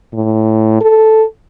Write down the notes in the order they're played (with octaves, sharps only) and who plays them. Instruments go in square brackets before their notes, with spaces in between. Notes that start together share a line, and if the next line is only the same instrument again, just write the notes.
[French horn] A2
A4